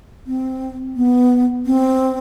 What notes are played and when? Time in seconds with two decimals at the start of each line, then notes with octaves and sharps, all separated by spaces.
0.27 C4
0.96 B3
1.66 C4